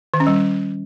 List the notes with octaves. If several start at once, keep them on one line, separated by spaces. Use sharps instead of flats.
D#3
C#4
G3